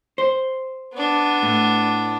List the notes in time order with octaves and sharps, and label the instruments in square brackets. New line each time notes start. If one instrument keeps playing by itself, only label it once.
[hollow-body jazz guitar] C5
[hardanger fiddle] B3 D4
[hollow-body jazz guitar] A2